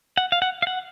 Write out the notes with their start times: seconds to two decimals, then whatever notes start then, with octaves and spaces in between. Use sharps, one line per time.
0.17 F#5
0.32 F5
0.42 F#5
0.62 F5
0.67 F#5